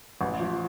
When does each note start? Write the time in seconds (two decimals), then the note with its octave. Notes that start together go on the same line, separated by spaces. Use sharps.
0.21 A1
0.40 F3